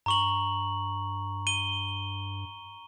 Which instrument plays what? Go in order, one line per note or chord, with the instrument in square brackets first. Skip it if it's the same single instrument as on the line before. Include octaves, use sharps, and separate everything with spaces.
[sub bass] G2 [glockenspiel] A#5 C#6 F#7
[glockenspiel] D#7 G7